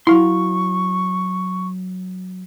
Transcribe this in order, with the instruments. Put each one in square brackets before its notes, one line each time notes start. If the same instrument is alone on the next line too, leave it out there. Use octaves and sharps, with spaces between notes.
[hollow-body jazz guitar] F#3 F5 C6 [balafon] E4 [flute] C#6